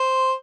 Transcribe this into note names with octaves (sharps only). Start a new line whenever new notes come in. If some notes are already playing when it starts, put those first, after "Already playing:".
Already playing: C5